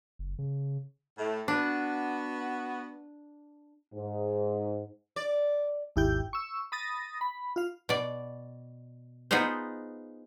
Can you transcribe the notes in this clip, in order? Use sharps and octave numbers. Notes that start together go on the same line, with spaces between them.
F#1
C#3
A2 A3
B3 D4 F#4
G#2
D5
G#1 D#2 E4 G4 G5 G6
C#6 E6
B5 D#6 A6 A#6
B5
F4 F5
B2 D5
B3 D#4 F4 G#4 C5